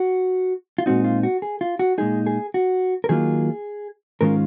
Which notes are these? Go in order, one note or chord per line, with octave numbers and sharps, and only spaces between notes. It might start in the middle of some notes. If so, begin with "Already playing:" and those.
Already playing: F#4
F4
A#2 G#3 C4 D#4 F#4
F4
F#4
G#4
F4
F#4
A#2 G#3 D#4 G#4
G#4
F#4
A#4
D#3 F#3 A#3 C#4 F4 G#4
G#2 D#3 G#3 C#4 F4 A#4